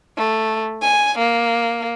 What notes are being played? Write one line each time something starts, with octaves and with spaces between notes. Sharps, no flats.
A3
G#5
A#3